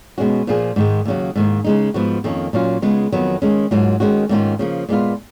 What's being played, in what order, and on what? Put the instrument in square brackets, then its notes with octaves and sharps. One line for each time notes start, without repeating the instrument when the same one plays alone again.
[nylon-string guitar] B2 G#3 C#4 F#4
A#2 F3 A#3 F4 G#4
G#2 D#3 G#3
D#2 C#3 F#3
G#2 D#3 A#3
C#3 G#3 D#4
G#2 F3 B3 F#4
F2 D#3 A#3 C#4
A#2 F#3 C#4 F4
C#3 G#3 B3 F4
F2 D#3 F#3 B3
D#3 G#3 C#4
G#2 F#3 A#3 F4
D#3 G#3 C#4 F#4
G#2 D#3 A#3 C#4 F4
C#3 F3 A#3
A#2 G#3 B3 F4